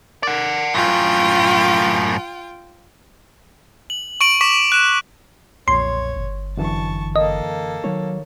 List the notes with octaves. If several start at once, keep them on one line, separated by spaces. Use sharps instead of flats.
A#4 D5 F#5
F#2 A2 F4 G5
F#7
C#6 D7 F#7
C#6 D6 B6 E7
F#6 E7
B1 F2 A#2 C#5 C6
G1
F#2 D3 E3 A5 C#6
A#3 A4 D#5
D#3 F#3 C#5